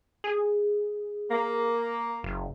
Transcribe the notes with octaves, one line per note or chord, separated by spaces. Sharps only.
G#4
A#3
F#1